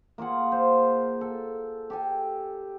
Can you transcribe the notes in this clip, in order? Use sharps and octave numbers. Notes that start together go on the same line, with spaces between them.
A#3 F4 G#4 F#5
C5
A4
G4 A4 G#5